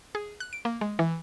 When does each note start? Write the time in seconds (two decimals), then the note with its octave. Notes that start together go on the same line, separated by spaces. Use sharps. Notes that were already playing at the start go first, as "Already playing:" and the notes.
0.15 G#4
0.40 F#6
0.53 D7
0.65 A#3
0.81 G#3
0.99 E3